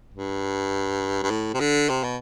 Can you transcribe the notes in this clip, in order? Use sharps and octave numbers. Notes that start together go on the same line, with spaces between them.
G2
G2
A2
C3
D3
C3
B2